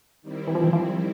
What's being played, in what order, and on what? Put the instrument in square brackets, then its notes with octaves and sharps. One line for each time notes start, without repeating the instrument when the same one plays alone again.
[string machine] D#3 G3 C4 E4
[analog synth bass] E3
F3
E3
F3